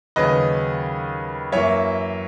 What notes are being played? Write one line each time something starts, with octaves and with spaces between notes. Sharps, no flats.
D#2 C#3 F#3 B4 D#5
F#2 E3 A#3 C#5 E5